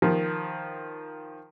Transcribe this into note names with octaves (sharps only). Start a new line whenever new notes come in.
D#3 F3